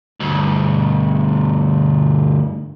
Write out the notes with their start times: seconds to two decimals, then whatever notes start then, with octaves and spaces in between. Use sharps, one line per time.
0.20 D2 G2